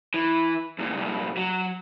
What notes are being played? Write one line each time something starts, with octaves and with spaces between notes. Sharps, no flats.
E3
E2 A#2
C2 A#2
F#3